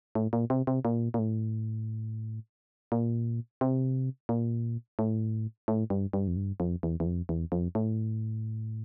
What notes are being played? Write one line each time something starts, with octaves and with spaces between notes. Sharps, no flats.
A2
A#2
C3
C3
A#2
A#2
A2
A#2
C3
A#2
A2
A2
G2
G2
F2
G2
F2
E2
E2
F2
E2
F2
A2